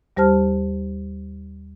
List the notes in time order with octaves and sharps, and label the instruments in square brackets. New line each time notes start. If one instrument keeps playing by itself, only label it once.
[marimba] D#2 G3 G4 C5 A5 F6